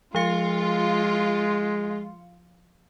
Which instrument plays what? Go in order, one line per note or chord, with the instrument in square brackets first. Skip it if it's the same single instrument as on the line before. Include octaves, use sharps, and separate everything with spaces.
[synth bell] F3 F5 C#7 [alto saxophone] G#3 [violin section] F4